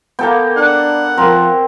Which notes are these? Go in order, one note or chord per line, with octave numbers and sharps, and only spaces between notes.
A#3 B3 A4 G5
D4 F#5
F3 C4 A#4